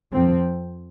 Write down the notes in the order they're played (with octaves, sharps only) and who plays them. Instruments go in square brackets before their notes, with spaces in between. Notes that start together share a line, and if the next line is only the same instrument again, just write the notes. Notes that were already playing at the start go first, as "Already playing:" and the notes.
[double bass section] F2 F3 C4